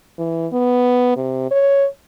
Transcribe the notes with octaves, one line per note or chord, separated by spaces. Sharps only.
E3
B3
C3
C#5